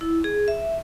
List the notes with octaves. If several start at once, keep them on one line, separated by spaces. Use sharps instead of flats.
E4
G#4
E5